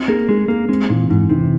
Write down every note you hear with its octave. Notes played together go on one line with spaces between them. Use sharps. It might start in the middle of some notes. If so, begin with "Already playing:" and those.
Already playing: C4
A#3 G#4
G#3 G#4
A#3 G#4
G#3 C4
A#2 E3
G#2 E3
C3 E3